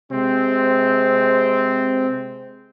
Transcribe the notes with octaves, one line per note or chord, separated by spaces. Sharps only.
C3 G#3 C4